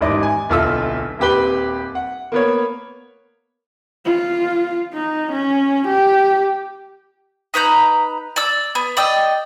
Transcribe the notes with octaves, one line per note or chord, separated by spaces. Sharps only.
A1 D#2 G#2 D#5 D6
G#5
D1 B1 F4 A4 E5 E6
D#1 C4 G4 B4 G7
F#5
A#3 B3 C#5
F4
D#4
C#4
G4
D#4 B4 A#5 G6
D5 E6
B3
D5 D#5 G5 E6